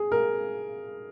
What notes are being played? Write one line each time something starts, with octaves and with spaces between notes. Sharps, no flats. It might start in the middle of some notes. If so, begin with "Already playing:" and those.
Already playing: G#4
A#4